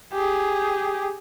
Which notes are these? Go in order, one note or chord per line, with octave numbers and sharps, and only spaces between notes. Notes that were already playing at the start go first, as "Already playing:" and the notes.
G4 G#4